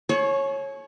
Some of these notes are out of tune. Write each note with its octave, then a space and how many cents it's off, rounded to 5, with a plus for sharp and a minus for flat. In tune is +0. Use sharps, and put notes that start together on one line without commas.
G#4 +45 C#5 -15 C#6 +15